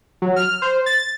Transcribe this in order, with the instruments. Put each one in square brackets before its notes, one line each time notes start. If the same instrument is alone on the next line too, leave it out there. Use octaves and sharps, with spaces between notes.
[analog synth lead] F#3
F6
C5
A6